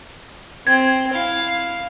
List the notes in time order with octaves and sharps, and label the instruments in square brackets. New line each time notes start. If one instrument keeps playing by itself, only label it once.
[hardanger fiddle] C4 [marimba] G#6
[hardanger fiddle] E4 F5